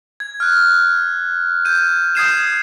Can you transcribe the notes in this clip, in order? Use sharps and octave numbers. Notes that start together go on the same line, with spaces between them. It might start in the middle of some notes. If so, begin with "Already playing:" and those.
G#6
F6 F#6
G6 D#7
D#6 G6 G#6 C7 D#7 E7